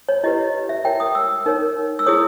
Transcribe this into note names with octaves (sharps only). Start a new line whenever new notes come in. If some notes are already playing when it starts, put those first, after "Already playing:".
C#5
E4 G4 B4 D#5
E5
E4 A#4 C#5 G5
D#6
E6
D#4 A#4 C#5
E6
E4 G#4 C#5 D#6